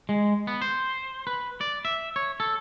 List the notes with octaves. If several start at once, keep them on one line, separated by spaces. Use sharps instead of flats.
G#3
B3
C5
B4
D5
E5
C#5
A4